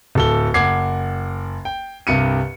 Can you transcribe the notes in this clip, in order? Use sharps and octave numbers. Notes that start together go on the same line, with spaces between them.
D1 A4 G7
F#1 F#5 D6 G#6 C7
G5
C2 G2 C#7 D#7